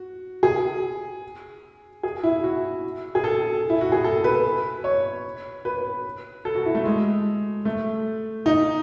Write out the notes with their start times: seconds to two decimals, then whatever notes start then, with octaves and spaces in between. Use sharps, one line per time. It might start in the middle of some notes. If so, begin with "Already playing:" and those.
Already playing: F#4
0.43 G#4
2.03 G#4
2.23 E4
2.44 F#4
3.15 G#4
3.24 A4
3.70 E4
3.81 F#4
3.92 G#4
4.04 A4
4.24 B4
4.84 C#5
5.65 B4
6.45 A4
6.55 F#4
6.66 E4
6.75 A3
6.85 G#3
7.65 A3
8.46 D#4